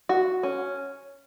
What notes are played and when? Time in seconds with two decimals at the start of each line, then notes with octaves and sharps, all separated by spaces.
0.09 F#4
0.43 C#4